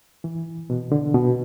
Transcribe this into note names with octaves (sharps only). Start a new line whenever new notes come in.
E3
B2
D3
B2